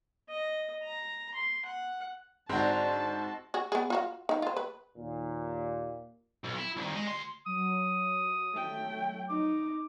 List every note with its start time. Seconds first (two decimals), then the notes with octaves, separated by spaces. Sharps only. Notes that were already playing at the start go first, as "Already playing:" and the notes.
0.29 D#5
0.83 A#5
1.34 C6
1.66 F#5
2.49 G#2 D3 C4 D4 F#4 A#4 A5
3.54 F#4 G#4
3.72 B3 G#4
3.90 F4 F#4 F5
4.29 D#4 F5
4.42 F4 C5
4.57 B4
4.98 D#2 A#2
6.44 B1
6.57 E4
6.76 C2 D#3
6.95 G#3 D#5
7.08 D2 C6
7.46 F#3 D#6
8.53 A3 G5
9.29 D#4 D6